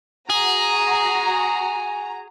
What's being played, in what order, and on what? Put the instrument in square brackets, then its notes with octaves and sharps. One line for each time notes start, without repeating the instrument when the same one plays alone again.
[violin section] F#4 A#5 [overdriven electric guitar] G#4